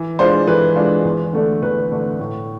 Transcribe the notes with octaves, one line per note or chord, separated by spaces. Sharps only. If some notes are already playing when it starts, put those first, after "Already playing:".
Already playing: E3
G#3 D4 F4 C5
E3 B4
G#3 D4 F4
E2
D3 A3 D4
E2 B4
D3 A3 D4
A2